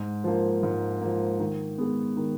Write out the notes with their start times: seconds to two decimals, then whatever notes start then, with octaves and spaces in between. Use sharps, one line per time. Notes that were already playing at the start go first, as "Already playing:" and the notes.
Already playing: G#2
0.24 F3 A#3
0.63 G#2
1.01 F3 A#3
1.40 D#3
1.78 G#3 B3
2.17 D#3